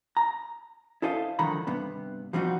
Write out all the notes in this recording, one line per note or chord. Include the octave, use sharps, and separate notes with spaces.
A#5
E4 A4 C5 D#5 F5
C2 F2 D3 D#3 A#5 B5
G2 C3 B3
F3 G3 C4 D#4 F#4